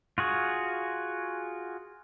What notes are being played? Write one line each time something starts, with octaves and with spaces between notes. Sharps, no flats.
F4 F#4 G#4